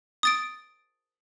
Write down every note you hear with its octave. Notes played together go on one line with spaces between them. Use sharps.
D#6 A6 D7